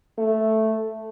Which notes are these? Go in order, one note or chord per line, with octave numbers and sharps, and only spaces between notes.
A3